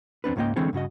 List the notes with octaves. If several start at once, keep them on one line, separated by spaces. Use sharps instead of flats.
E2 C4 D4 B4
C#2 G#2 C#3 A#3 D#5 G5
D3 E3 G#3 C4 C#5
G2 C#3 F#4 D#5